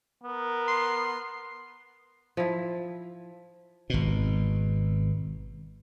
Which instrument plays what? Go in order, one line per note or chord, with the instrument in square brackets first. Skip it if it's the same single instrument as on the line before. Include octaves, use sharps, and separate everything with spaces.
[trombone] B3 [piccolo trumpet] A#4
[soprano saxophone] C6
[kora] F3 E4
[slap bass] G#1 B2